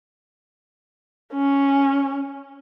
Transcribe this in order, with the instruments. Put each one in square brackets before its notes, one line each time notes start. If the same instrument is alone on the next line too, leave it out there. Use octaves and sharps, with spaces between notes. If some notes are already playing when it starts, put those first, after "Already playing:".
[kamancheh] C#4